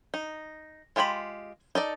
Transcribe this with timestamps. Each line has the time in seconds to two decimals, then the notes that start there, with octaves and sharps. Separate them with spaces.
0.14 D#4
0.96 G#3 F4 G4 C5 B5
1.75 D#4 A4 D5